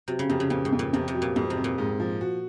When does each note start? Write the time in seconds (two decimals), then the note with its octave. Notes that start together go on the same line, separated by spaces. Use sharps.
0.08 C3 F#3
0.19 C#3
0.29 F2 C3
0.40 C#3
0.50 F2 A#2
0.65 G#2
0.72 F2
0.79 A#2
0.93 F2 C3
1.08 C3
1.14 F#3
1.22 A#2
1.36 F2 G#2
1.50 C3
1.57 C4
1.64 A#2
1.78 G#2
2.00 F3
2.21 F#4